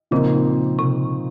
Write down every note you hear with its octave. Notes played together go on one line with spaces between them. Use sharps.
A#2 C#3 F3 C4 D#4
C3